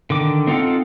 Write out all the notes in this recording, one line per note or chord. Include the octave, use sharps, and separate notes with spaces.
D3 D#3 D6
C4 D#4 F4 A4 F#5